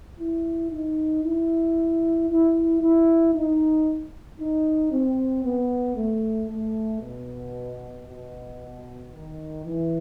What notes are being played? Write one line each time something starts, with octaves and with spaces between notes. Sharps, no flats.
E4
D#4
E4
E4
E4
D#4
D#4
C4
B3
A3
A3
B2
B2
D#3
E3